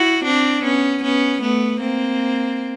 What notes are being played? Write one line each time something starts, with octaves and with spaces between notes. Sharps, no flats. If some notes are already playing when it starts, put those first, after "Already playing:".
Already playing: E4 F#4
C4 D4
B3 C#4
B3 C#4
A3 B3
A#3 C4